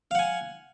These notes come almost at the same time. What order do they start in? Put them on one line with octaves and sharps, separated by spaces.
F5 F#5 G#5